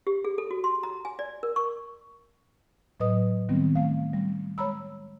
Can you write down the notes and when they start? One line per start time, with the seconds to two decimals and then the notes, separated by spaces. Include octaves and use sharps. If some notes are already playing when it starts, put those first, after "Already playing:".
0.07 G4
0.25 G#4
0.38 A4
0.51 F#4
0.64 C6
0.83 A#5
1.05 G#5
1.19 D5
1.43 A#4
1.56 C#6
3.00 A2 F#3 B4 D#5 D#6
3.49 D#3 G3 B3 C4
3.75 A3 F5
4.14 G3
4.58 G#3 C#5 A#5 B5 E6